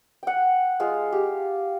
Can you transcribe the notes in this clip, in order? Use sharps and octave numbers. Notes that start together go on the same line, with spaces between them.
F#5 G5
G#3 F4 F5
G4